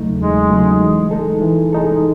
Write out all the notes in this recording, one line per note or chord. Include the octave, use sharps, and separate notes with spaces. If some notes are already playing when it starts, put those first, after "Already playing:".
Already playing: E2 C#3 F#3 A3 D#4
E2 G#3
C#3 F#3 A3 D#4
E3
G#3 D#4 A4
E3
G#3 D#4 A4